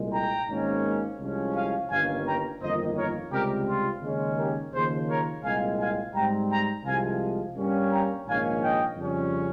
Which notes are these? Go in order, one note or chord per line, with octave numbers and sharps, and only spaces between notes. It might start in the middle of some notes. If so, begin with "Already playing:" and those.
Already playing: C2 A#2 G#3
G5 A#5
G#1 G#2 D#3 A#3 C#4
C2 C3 F3 G#3 C#4
F5 G#5
G1 G2 D#3 A#3 C#4 F5 G#5
G5 A#5
G1 F2 D#3 A#3 C5 D#5
A#4 C#5
C#2 C3 G3 C4 G4 A#4
F4
D#2 C#3 G#3 C#4
G4 A#4
D#2 C#3 F3 G#4 C5
A#4 C#5
C2 A#2 G#3 C4 F5 G#5
F5 G#5
G#2 G3 C4 G5 A#5
G5 A#5
C2 C3 F3 G#3 F5 G#5
G2 G3 A#3 C#4
G5 A#5
A#1 G#2 D#3 A#3 C#4 F5 G#5
D#5 G5
F2 C#3 G3 C#4